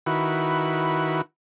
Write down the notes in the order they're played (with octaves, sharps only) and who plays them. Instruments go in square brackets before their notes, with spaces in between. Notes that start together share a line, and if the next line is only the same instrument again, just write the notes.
[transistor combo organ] D#3 E4 F#4 B4